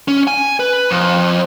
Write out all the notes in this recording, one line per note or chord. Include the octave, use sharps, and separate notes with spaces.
C#4
G#5
B4
F2